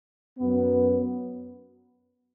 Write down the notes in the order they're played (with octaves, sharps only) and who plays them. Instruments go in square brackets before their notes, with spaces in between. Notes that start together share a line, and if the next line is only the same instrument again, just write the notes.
[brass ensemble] F#2 F#3 B3